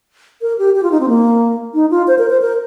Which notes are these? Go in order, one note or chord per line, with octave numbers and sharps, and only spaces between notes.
A#4
G4
G4
F4
D#4
C4
A#3
D#4
F4
C5
A#4
C5
A#4